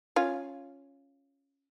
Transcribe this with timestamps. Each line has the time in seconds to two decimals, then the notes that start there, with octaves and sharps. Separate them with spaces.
0.16 C#4 F4